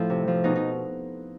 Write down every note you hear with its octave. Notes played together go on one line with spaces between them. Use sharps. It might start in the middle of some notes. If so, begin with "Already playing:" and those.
Already playing: A2 F3 E4 A4
C3
F3
B2 D#4
D#4